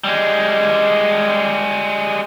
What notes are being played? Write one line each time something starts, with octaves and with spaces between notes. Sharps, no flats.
G3 G#3